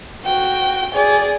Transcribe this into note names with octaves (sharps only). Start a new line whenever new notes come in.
F#4 G5
G#4 D5